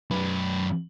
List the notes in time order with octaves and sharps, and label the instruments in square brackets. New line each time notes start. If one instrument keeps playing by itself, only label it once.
[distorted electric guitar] F#2 B4